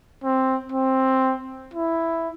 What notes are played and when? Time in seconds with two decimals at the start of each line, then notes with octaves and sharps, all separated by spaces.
0.24 C4
0.72 C4
1.74 E4